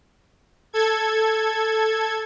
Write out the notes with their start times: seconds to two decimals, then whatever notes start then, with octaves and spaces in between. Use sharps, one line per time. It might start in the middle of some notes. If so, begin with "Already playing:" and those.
0.73 A4 G#6